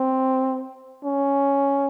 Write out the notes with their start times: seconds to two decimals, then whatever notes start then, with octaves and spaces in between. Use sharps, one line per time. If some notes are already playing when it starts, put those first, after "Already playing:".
Already playing: C4
1.04 C#4